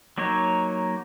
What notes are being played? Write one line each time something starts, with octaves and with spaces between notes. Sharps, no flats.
F#3 A#3 D#4 C#5